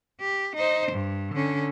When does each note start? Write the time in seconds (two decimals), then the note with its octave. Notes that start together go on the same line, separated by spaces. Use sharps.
0.20 G4
0.56 D#4 C5
0.92 G2
1.34 D3 C#4